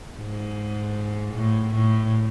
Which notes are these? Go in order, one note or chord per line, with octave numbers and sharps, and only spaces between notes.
G#2
A2
A2